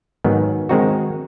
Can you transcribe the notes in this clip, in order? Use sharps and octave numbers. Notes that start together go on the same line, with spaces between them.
G#2 D#3 F#3 B3
D#3 G#3 C4 D#4 F#4